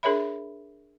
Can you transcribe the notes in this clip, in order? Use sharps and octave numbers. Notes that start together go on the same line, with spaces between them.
D4 G#4 A#4 C#5 E5 B5